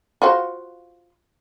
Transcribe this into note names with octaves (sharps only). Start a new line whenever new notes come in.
F4 F#4 C5